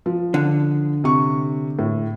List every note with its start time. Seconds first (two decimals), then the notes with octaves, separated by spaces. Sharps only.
0.06 F3
0.34 D3
1.04 C3 C#6
1.79 A2